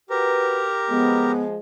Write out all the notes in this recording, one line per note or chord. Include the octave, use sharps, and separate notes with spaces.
F#4 G4 A#4 B4 A#5
F3 G#3 B3